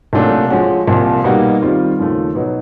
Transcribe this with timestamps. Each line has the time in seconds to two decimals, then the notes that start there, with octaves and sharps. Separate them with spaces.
0.13 C2 A#2 F#3 A3 D4
0.50 F3 G#3 C#4 F#4
0.87 C2 A#2 F3
1.24 B2 G3 A#3 D#4 F#4
1.61 D#3 G3 C4 F4
1.99 D#2 C#3 F3 A3
2.35 B2 F#3 B3 D#4